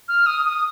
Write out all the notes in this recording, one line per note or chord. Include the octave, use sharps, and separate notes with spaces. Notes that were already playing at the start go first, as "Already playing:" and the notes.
F6
D#6
D#6